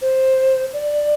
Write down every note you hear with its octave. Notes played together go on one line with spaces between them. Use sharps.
C5
D5